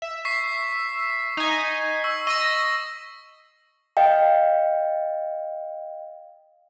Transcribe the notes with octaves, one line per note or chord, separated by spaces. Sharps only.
E5
C#6 B6 C7
D#4 G#5
C#6 E6
D#5 C#6 E6 A#6
D#5 F5 G5